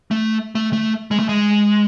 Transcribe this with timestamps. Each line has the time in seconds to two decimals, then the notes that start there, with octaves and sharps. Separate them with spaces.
0.11 A3
0.55 A3
0.73 A3
1.11 G#3
1.19 A3
1.29 G#3